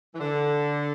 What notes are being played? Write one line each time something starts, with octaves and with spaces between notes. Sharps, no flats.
E3
D3